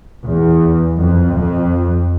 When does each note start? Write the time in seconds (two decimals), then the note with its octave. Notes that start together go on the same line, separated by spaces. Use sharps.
0.24 E2
0.99 F2
1.36 F2